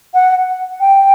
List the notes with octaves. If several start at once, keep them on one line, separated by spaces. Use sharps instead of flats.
F#5
G5